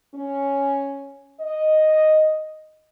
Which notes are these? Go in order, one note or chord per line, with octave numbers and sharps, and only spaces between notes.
C#4
D#5